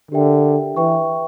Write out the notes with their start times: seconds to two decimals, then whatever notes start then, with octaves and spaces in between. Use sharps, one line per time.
0.11 D3 D4 G4 A#4 E5 G5
0.76 E3 B4 E5 G5 C#6